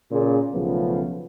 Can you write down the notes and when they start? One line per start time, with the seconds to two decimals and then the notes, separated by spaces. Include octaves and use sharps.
0.11 A#2 C#3 G#4
0.53 B1 C#3 F3 A3 B3 C#4